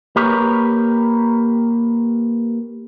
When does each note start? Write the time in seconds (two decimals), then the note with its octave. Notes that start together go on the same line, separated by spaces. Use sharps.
0.16 A#3 G4 A#4 B4 C#5